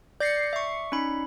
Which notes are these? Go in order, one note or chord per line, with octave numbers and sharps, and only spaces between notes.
D5 G6 A6 A#6 C7 C#7
E5 C#6
C#4 D#4 B5